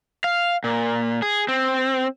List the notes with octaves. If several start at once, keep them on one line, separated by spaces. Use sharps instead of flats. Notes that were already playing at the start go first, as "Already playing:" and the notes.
F5
A#2
G#4
C4